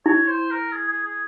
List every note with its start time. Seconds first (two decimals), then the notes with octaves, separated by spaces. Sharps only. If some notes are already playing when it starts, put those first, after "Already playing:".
0.06 E4 C#5
0.28 C5
0.50 A#4
0.72 G#4
0.88 G#4
1.05 G#4